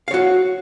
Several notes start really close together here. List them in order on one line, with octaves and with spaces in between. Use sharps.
F5 C#5 F#4